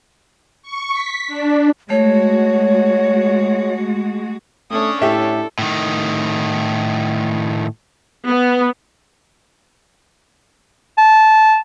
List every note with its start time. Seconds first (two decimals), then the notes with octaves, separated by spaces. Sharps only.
0.63 C#6
0.92 B6
1.27 D4
1.90 G#3 A3 F#4 C#5
4.71 A3 C#4 D4 C#5 D#6
5.02 A2 E4 G4 A4 E5
5.59 A2 D#3
8.28 B3
10.98 A5